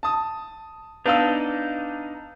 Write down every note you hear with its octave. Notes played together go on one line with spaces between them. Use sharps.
A5 D#6
B3 D4 D#4 F5 E6